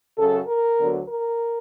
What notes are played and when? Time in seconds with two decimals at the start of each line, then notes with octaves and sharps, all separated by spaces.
0.18 F#2 C#3 F#3 A4
0.48 A#4
0.79 D2 D3 F#3 B3
1.08 A#4